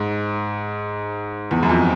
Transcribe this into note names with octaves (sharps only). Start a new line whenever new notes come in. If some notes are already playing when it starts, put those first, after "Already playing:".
Already playing: G#2
E2
F#2
F2